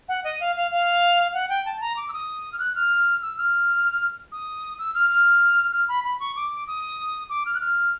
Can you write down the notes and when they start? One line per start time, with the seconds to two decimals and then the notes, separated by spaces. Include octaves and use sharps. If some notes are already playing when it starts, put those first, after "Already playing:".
0.09 F#5
0.24 D#5
0.40 F5
0.56 F5
0.71 F5
1.34 F#5
1.49 G5
1.66 A5
1.81 A#5
1.97 D6
2.08 E6
2.13 D#6
2.52 F6
2.59 F#6
2.75 F6
3.22 E6
3.38 F6
4.32 D#6
4.79 E6
4.95 F6
5.10 F6
5.73 F6
5.88 B5
6.04 B5
6.20 C#6
6.36 D6
6.67 D#6
7.29 D6
7.46 F6
7.54 F#6
7.61 F6